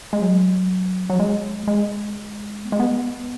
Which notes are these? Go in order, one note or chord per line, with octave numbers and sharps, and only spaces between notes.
G#3
F#3
F#3
G#3
G#3
B3
G#3
B3